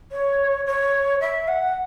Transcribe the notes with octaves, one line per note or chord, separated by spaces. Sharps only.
C#5
C#5
E5
F#5